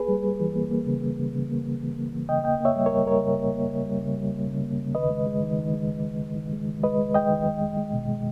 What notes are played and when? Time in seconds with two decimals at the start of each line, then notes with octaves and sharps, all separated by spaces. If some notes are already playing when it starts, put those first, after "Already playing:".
Already playing: A#3 G#4 B4
0.09 G3
0.25 G3
0.40 E3
0.56 A#3
0.71 A#3
0.87 C#3
1.02 C#3
1.19 C#3
1.35 C#3
1.50 A#3
1.65 A#3
1.81 E3
1.97 A#3
2.13 E3
2.29 C#3 D#5 G5
2.44 A#3 D#5 G5
2.60 A#3 C#5 E5
2.76 G3
2.86 A#4 C#5
2.92 G3
3.07 G3 A#4 C#5
3.22 C#3
3.38 A#3
3.54 A#3
3.70 C#3
3.85 G3
4.01 C#3
4.17 G3
4.32 A#3
4.48 C#3
4.63 A#3
4.80 C#3
4.95 D#3 B4 D#5
5.10 G#3
5.26 G#3
5.42 D#3
5.58 D#3
5.74 G#3
5.89 D#3
6.05 G#3
6.21 D#3
6.36 D#3
6.53 G#3
6.67 D#3
6.83 G#3 B4 D#5
6.98 G#3
7.14 G#3 D#5 G5
7.30 D#3
7.46 G#3
7.61 G#3
7.77 G#3
7.93 B2
8.09 G#3